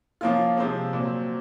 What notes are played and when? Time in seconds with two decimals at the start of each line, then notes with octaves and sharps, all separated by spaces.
0.21 F3 A#3 C#4 F4
0.57 C3 F3 G#3 C4
0.93 A#2 F#3 C4